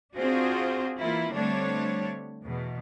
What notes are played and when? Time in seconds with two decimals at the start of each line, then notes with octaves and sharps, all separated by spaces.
0.16 C4 D4 F4 F#4 G#4 C5
0.98 E3 A#3 E4 F4
1.35 D3 G3 A3 C4 D4 C#5
2.44 E2 B2